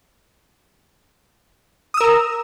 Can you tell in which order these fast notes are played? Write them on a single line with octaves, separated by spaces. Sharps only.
D#6 E6 A#4 A#5